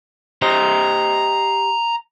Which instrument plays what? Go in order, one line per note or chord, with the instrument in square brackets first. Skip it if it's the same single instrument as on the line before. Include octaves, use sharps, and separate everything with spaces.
[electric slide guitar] G4 C5 D#5 [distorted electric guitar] A#5